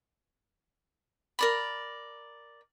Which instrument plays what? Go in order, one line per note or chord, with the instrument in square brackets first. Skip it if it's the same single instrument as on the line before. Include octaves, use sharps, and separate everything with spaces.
[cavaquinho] A#4 D5 B5